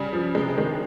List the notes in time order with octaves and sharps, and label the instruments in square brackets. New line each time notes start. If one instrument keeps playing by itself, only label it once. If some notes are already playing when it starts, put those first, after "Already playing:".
Already playing: [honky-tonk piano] C#3 G3
F3
C3 G#3
D#3 G#3